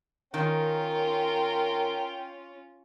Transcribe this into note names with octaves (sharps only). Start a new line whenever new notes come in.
D#3 C#4 F4 A#4 G5